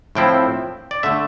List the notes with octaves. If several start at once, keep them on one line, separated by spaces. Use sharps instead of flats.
A2 F3 C4 E4 G5
D5
D3 A3 E5